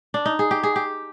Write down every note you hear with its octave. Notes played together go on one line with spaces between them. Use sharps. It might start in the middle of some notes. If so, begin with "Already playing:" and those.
D4
D#4
G#4
G4
G#4
G4